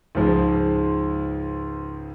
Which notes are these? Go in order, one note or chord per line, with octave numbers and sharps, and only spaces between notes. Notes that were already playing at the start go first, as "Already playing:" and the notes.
C#2 G#2 F3 G#3